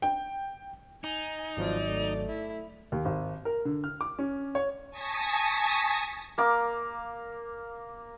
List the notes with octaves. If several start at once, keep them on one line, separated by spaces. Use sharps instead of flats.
G5
D#4 G#5
G#1 F3 F#3 D5
A3
E4
D#2
G#1
A#4
D3
F6
D6
C#4
C#5
G#5 A5 C#6 D#6 A#6 B6
A#3 D6